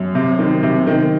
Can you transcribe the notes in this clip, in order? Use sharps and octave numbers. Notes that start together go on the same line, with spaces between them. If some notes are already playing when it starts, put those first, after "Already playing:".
Already playing: F#2
C3
D#3
C3
D#3